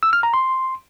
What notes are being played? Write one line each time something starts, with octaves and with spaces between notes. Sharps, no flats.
E6
F6
A#5
C6